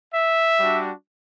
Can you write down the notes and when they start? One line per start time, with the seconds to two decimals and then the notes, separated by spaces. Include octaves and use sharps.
0.13 E5
0.60 G3 D4 F#4